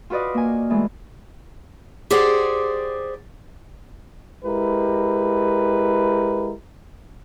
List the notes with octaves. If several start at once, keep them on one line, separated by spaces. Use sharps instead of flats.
F4 F#4 B4 D5 D#5
A#3 G#5
E3 G#3 A3
G4 G#4 C5 D5 F#5
G#3 E4 G4 A#4 B4